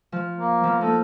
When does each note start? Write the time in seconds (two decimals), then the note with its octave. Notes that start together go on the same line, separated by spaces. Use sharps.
0.12 F3
0.39 A#3
0.63 F3 B3
0.81 A#3 D#4 A4